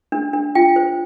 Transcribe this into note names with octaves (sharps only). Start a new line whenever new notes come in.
D4
D4
F4 G5
C5